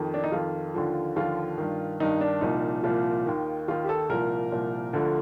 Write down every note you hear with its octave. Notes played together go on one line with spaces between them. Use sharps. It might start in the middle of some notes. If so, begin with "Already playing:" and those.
Already playing: F2 D#3
D4
D#4
F2 D#3 F4
D#2 D3 F3
D#2 D3 F3 F4
G2 D#3
G2 D#3 D#4
D4
C2 A#2 F3 D#4
C2 A#2 F3 F4
D#2 D#3
D#2 D#3 F4
G4
A4
C2 A#2 F3 A#4
C2 A#2 F3
D2 D3 F3